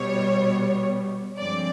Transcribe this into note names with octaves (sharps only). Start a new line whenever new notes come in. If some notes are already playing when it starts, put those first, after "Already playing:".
Already playing: B2 G3 B3 C#5
G2 D3 F3 G#3 C4 D5